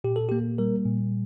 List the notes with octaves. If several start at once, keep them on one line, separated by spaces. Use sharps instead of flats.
A#2 G4
A4
A#3 G4
G3 A#4
A#2